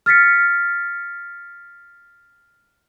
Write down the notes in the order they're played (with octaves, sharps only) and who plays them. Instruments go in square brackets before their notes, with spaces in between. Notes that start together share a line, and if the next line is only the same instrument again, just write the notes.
[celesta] F6 A6 B6 C#7